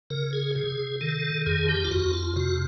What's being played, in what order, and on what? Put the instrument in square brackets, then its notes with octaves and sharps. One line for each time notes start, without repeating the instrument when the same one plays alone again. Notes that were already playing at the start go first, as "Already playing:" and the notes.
[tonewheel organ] C#3 A#4
G#4
C3 G#4
D#3 A4
F2 G#4
G4
F4
F2 F#4
F4
C3 F#4